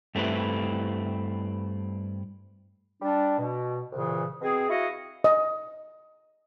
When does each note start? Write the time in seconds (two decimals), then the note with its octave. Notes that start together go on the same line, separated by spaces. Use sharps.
0.15 G2 A3 C4 E4 G4 B4
3.02 G3 D4
3.38 B2
3.92 C2 A#2 C#3 E3
4.41 B2 C4 G#4
4.69 E4 F#4 G#4 D#5 F5
5.24 D#5